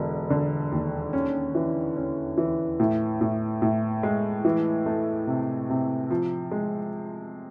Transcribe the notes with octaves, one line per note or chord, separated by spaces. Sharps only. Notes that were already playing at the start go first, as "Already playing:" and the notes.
Already playing: E1 D3
D3
D#2
C#4
E3
C#4
E3
A2
A2
A2
G#3
E3
A3
C3
C3
F3
G#3